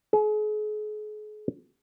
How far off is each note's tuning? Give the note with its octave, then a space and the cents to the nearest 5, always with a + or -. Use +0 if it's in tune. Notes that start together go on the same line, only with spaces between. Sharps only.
G#4 +40